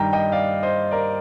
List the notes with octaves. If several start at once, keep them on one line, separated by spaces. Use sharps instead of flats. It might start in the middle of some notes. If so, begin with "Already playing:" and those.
Already playing: G2 D#3 G3 G5 A#5
D#5 G5
D5 F5
C5 D#5
A#4 D5